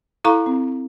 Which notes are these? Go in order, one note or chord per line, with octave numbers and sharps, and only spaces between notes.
E4 A4 F5 A#5 C#6
C4